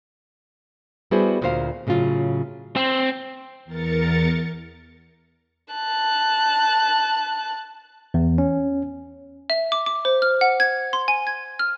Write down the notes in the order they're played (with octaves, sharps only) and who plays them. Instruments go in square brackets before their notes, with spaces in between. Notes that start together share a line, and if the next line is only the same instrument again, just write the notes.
[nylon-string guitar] G3 B3 E4 F#4 G#4 C5
D2 A#2 C5 F5
A2 C#3 F#3 F4
[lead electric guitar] C4
[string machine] E2 A#4 A6 C#7
[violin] A5 F#6
[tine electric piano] E2
C#4
[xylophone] E5
D6
D6
C5
F6
F#5
G#6
C6
G#5
G#6
F6